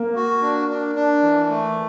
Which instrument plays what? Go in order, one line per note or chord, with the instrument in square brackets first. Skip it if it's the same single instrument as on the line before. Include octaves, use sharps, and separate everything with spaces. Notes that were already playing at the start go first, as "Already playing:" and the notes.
Already playing: [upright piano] A#3
[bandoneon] F#4
D4
D4
D4
E3
A3